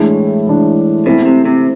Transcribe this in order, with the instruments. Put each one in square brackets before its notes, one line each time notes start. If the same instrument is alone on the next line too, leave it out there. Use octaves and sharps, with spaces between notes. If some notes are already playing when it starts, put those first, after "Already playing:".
Already playing: [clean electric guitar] A2 [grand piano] E3 G#3 D4
[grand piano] E3 G#3 D4
[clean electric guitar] B2 [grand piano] A3 C4 E4
[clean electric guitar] C3
C3